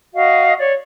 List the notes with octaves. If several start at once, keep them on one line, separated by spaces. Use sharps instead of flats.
F#4 D#5 F5
C#5 D5